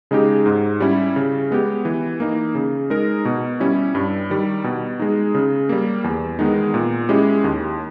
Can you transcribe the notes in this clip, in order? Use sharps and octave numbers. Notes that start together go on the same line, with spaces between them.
C#3 G#3 D#4 G4
G#2
G3 C#4 E4
C#3
G#3 B3 G4
E3
A#3 D#4
C#3
G#3 D#4 A#4
B2
G3 C#4 E4
G2
D#3 G3
B2
G#3 D#4
C#3
G3 A#3
E2
D#3 G#3 B3 D#4
A#2
G#3 C#4 E4 G4
D#2